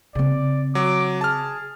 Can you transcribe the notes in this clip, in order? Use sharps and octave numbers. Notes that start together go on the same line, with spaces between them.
C#3 C4 D5
F#3 D6
G#4 A5 F6